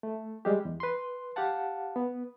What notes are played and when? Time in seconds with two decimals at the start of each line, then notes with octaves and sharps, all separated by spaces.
0.03 A3
0.45 G3 G#3 G4
0.65 E2
0.80 B4 C6
1.36 G4 F5 F#5 A5
1.96 B3